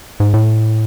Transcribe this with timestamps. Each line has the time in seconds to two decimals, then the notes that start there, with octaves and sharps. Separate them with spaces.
0.20 G#2
0.34 A2